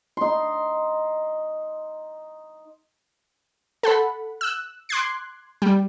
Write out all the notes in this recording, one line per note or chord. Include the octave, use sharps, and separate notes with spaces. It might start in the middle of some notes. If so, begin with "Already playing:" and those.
D#4 C6
A4 F#5 B5
E6 F#6
C6 D6 F#6 G#6 C7
G3